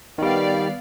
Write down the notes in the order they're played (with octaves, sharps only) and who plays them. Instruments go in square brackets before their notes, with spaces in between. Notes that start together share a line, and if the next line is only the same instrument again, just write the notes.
[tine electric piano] D#3 G3 [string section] B3 D5 F5